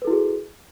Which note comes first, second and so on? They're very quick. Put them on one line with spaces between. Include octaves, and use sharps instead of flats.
B4 A4 E4 F#4 G#4